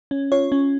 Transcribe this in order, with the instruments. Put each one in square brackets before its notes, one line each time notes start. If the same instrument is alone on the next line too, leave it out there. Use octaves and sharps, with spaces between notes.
[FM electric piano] C#4
F4 C#5
C#4